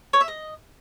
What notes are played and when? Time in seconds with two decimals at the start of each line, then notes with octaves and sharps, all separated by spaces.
0.13 C#5
0.21 E5
0.28 D#5